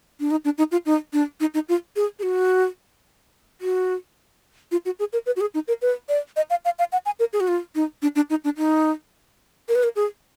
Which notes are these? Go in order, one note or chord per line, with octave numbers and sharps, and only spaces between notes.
D4
D#4
D4
D#4
F4
D#4
D4
D#4
D#4
F4
G#4
G#4
F#4
F#4
F4
F#4
G#4
A#4
B4
F#4
G#4
D#4
A#4
B4
D5
D#5
F5
F5
F5
F#5
G#5
A#4
G#4
F#4
F4
D#4
D4
D4
D#4
D4
D#4
A#4
B4
A#4
G#4